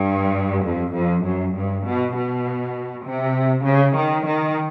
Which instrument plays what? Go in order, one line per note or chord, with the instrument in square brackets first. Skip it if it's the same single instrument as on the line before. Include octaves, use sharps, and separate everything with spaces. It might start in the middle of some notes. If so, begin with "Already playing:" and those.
Already playing: [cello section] G2
F2
F2
F#2
G2
B2
B2
C3
C#3
D#3
D#3